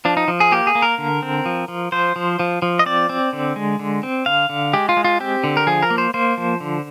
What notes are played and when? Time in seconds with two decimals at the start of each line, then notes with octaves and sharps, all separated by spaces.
0.05 F3 D4
0.17 D#4
0.28 F3
0.40 G#4
0.52 A#3 G4
0.67 G#4
0.75 A#3
0.82 A#4
0.98 D3
1.23 C4
1.46 F3
1.68 F3
1.92 F3 C5
2.16 F3
2.39 F3
2.62 F3
2.79 D#5
2.86 C4 D5
3.09 C4
3.33 D3
3.56 G#3
3.79 D3
4.03 C4
4.26 D3 F5
4.49 D3
4.73 G#3 G4
4.89 F4
4.97 G#3
5.04 F4
5.20 C4 G4
5.44 D3
5.57 A#4
5.67 F3 G#4
5.83 A#4
5.90 A#3
5.98 C5
6.14 A#3 C5
6.37 F3
6.60 D3